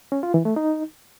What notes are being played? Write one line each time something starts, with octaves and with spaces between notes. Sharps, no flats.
C#4
F4
E3
A3
D#4